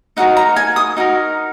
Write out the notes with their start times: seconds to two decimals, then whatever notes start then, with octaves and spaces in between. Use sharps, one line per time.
0.17 D#4 F#4 A#4 F#5
0.37 A#5
0.56 G#5
0.76 D#6
0.97 D#4 F#4 A#4